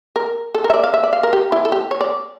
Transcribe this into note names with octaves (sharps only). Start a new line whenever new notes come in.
A#4
A4
A#4
E5
D5
F5
E5
D5
F5
A#4
G4
E4
A4
G4
C#5
D5